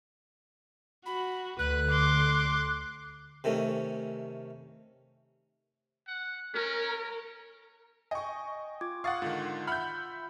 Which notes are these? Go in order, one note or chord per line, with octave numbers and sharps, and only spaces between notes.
F#4 B5
D2 D3 B4 F#6
C6 D6
C3 D#3 A3 C#4
F#5
C#4 A#4
D#5 G5 G#5 C#6
F4 D6 G#6
F5 F#5 C#6 D#6 A6
G#2 D3 D#3 F4
E5 F#5 B5 F6 G6